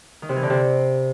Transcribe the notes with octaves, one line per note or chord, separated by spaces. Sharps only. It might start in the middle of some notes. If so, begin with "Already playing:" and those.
D#3
C3
E3
D3
C3